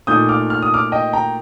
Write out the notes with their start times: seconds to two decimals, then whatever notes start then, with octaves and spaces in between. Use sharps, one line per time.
0.07 A#2 A3 D#4 D#6 G6
0.29 D6 F6
0.50 F6
0.62 D#6
0.74 D6 F6
0.92 D#5 G5
1.13 G5 A#5